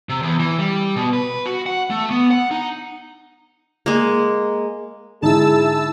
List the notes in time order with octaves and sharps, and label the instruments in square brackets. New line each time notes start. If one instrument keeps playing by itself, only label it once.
[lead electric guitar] C3
E2
E3
G3
B2
B4
F#4
F#5
A3
B3
F#5
D#4
[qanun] G#3 A#3
[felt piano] G#2 D3 D#4 [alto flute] E4 [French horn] G#4 [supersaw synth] A5 E6